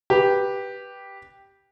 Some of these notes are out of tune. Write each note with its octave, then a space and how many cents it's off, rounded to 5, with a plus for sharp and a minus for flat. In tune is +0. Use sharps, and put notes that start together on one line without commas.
G4 +0 B4 -10